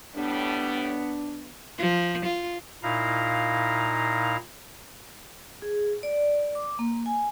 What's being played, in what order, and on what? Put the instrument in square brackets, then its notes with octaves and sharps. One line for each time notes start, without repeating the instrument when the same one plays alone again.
[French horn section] A2 G3 [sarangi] B3 [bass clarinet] D4
[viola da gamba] F3
F4
[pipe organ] A#2 D#4 E4 F5 A#5
[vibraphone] G#4
D5
D6
A#3
G#5